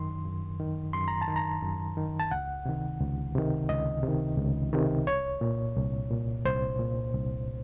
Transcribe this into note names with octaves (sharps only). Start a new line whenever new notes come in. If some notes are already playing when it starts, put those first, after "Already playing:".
Already playing: F#2 D#3 C6
F#2
D#3
F#2 C6
A#5
A5
D#3
A#5
F#2
D#3
A5
C#2 F#5
C3 D#3
C#2
C3 D#3
C#2 D#5
C3 D#3
C#2
C3 D#3
C2 C#5
A#2
C2
A#2
C2 C5
A#2
C2